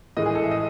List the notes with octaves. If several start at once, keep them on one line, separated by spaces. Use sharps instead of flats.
A2 E3 G#3 D#5
G#4
A4
E5
D#5